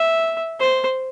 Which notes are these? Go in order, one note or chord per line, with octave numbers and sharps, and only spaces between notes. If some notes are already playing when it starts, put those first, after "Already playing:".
Already playing: E5
C5